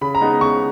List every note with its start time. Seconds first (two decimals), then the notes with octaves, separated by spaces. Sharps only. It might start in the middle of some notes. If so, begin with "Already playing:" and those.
0.01 C#3 B5
0.15 A#5
0.21 G#3 B3 D#4
0.41 C#3 C#6